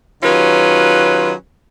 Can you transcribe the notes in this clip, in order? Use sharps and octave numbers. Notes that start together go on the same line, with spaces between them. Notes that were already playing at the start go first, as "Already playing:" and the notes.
D#3 F#3 C#4 F4 G4 B4